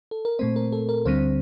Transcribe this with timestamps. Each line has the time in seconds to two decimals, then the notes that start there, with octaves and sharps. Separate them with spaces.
0.11 A4
0.25 A#4
0.39 A#2 A3 C4 C5
0.56 A#4
0.72 A4
0.89 A#4
1.05 D2 D3 G3 C4 C5